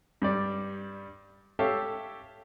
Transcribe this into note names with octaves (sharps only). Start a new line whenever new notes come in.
G2 G3 D5
G4 A4 C#5 E5 F5